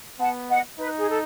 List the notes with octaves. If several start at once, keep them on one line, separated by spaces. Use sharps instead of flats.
B3 F#5 A5
D#5 F#5
D#4 B4
G#4
A4